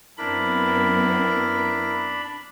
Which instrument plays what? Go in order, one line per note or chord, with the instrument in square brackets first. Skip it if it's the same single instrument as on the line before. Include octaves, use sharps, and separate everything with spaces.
[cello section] F#2 B3 C4 [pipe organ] D4 B5 [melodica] E4 A#4